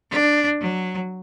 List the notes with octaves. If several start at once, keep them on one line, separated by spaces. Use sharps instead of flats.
D4
F#3